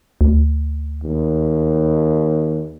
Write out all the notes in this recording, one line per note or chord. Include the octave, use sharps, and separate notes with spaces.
D2
D#2